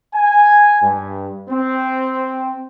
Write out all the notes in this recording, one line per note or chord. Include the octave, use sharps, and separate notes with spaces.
G#5
G2
C4